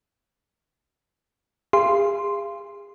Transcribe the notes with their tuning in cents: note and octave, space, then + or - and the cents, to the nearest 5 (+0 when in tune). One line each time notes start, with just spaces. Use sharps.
G#4 -45 F5 -35 C6 -5